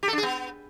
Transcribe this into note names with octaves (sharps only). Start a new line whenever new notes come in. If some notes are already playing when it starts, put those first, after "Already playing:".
G4
A4
D4
G#4
B3